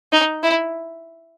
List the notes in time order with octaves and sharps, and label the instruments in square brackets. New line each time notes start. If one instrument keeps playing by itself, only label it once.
[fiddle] D#4
E4